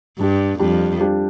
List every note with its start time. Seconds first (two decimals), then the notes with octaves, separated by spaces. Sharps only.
0.19 G2 G3 D4 G4
0.59 F2 G3 D4 G4
1.00 G3 D4 G4